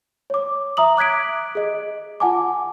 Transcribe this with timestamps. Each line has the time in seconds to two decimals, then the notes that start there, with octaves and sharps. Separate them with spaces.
0.30 C#5 D6
0.77 E5 A#5 D#6 F#7
0.97 D6 F#6 G#6 B6 D7
1.55 G#4 D#5
2.20 F4 F#5 G#5 A5 D6